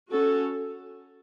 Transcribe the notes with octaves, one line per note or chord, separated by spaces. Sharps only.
C#4 F#4 A4